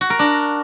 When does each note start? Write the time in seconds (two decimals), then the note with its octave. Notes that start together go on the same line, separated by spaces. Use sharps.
0.01 F#4
0.10 A#4
0.19 D4